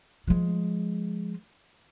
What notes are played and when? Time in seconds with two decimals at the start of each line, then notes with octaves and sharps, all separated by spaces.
0.28 F3 G#3